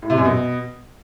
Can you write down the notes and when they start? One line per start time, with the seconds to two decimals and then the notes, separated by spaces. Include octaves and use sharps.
0.02 A2
0.10 C3
0.17 F#2
0.25 B2